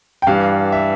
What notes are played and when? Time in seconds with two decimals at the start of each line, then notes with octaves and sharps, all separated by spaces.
0.22 G5
0.27 G2 E3 G3 F5
0.72 E5